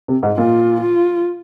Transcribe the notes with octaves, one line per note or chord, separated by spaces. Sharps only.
C3
G#2
A#2 F4
F4